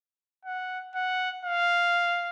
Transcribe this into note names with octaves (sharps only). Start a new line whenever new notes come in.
F#5
F#5
F5